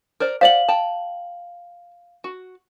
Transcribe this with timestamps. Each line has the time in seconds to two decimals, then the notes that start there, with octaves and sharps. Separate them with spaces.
0.20 A#4 C5 D5
0.41 C5 D5 F5 F#5 F#7
0.69 G5 A5
2.24 F#4